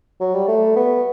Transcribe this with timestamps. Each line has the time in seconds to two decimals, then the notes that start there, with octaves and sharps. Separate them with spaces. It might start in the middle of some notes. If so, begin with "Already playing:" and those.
0.21 F#3
0.34 G3
0.48 A3
0.76 B3